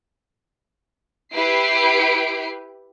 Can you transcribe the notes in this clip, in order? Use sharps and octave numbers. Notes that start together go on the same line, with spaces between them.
E4 G4 B4 C7 D7